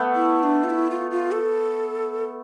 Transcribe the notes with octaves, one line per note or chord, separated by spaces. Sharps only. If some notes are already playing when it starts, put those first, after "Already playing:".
Already playing: A3 B3
E4
D4
F4
E4
F4
F4
A4